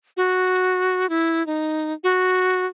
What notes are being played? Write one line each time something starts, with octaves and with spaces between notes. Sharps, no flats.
F#4
E4
D#4
F#4